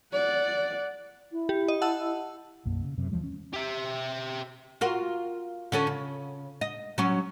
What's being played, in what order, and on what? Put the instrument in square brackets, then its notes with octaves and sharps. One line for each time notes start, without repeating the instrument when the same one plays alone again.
[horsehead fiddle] D5 F#5
[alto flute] E4
[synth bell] G4
D#5
F#5 A5 E6
[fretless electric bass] B1 F#2 A#3
C#3
F#2 C3
D#2 E3 F3 G#3
C#4
[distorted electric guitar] G4 E5
[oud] F4 F#4 A#4
D3 C#4 A4
C#3
D#5
F#3 C#4